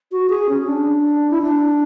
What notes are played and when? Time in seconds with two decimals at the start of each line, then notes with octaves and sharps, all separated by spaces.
0.11 F#4
0.29 G#4
0.49 C#4
0.67 D4
1.30 E4
1.42 D4